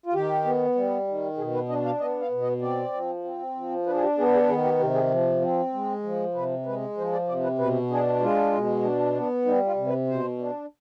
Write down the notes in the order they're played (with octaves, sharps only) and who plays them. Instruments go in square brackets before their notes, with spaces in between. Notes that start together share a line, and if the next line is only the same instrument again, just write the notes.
[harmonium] F4
D#3 G4
B3
G3
D#3
B2 G#4
B4
D4 D#5
F5
B3 D#5
F5
B2
D#5
C4 D5
F3
C4
F3
D4 B4
G#4
G4
B3 G#4
G#4
D#3 G#4
G4
C3 G4
G#4
F3
C4
G#3
F3
C3 B4
G#3 B4
F3 C5
D5
C3 D5
B4
B2 B4
D4 G#4
G#3 F4
B2
D4
B3
G3 D#4
F4
C3
B4
B2 C5
D4